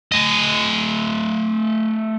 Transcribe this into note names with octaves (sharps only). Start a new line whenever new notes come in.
A3 D#5